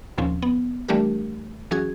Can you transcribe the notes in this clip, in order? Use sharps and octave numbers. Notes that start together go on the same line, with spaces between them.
D#2 A#2 F3 C4 C#4
B3
E3 G3 A3 D4 G4 A#4
E3 F#3 C#4 F#4 G#4 G#6